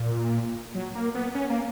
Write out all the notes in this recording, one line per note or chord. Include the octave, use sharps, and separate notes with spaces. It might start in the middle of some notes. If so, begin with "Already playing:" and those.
Already playing: A#2
F#3
A#3
B3
C#4
A#3